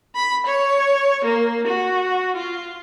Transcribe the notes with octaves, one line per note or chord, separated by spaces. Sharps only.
B5
C#5
A#3
F#4
F4